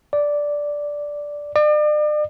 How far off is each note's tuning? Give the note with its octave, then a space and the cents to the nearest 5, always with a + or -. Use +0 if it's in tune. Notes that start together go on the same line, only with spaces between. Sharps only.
D5 -5
D5 +40